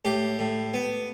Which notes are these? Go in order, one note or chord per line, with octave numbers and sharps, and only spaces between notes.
A2 G4
A2
B3